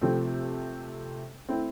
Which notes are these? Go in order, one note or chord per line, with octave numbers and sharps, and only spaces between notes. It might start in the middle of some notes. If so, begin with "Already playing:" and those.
C3 F3 A3 C4
A3 C4 E4